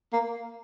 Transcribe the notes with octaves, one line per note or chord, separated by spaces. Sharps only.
A#3